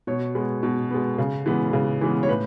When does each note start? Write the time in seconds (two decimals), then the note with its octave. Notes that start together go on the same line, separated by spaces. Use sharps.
0.07 B2 C#5
0.35 G#3 B3
0.63 B2
0.91 G#3 B3
1.18 C#3
1.46 E3 G#3 B3
1.73 C#3
2.01 E3 G#3 B3
2.23 C#5
2.29 A2 B4